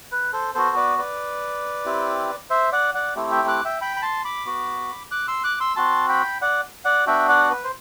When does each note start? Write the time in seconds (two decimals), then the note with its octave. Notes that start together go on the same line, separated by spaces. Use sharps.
0.12 B4
0.33 A4 C5
0.54 B3 F#4 A4 C5
0.77 B4 D5
0.98 B4 D5
1.85 C4 E4 G4
2.50 C5 E5
2.72 D5 F#5
2.94 D5 F#5
3.15 A3 C4 E4 G4
3.32 E5 G5
3.48 D6 F#6
3.65 E5 G5
3.81 G5 B5
3.97 B5
4.02 A5 C6
4.25 B5 D6
4.46 B3 F#4
5.11 D6 F#6
5.28 C6 E6
5.44 D6 F#6
5.60 C6 E6
5.76 C4 F#4 A5 C6
6.09 G5 B5
6.42 D5 F#5
6.85 D5 F#5
7.06 B3 D4 F#4 E5 G5
7.29 D5 F#5
7.51 B4
7.64 C5